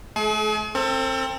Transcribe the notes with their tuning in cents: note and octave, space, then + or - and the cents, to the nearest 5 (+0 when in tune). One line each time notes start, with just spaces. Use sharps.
A3 -40 G#4 +40 G#5 +40
C4 +20 A4 +40